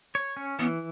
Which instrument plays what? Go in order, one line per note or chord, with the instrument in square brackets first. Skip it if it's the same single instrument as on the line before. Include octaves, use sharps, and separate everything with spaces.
[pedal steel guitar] C#5
C#4
[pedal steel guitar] E3 [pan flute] B3